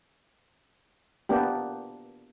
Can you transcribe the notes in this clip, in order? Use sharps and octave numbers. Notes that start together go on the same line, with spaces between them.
A#3 B3 D4 G4